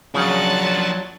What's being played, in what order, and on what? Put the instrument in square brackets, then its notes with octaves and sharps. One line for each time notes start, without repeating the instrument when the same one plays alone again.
[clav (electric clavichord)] C#3 [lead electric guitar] F3 D4 [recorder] F#3 [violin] F#5 A5